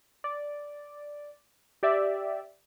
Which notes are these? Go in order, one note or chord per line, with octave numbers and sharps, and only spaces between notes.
D5
G4 D5 E5